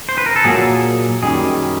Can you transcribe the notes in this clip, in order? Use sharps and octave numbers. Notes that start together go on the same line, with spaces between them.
C5
B4
A#4
A4
A#2 F#3 A#3 G#4
F#2 D#3 G3 G#4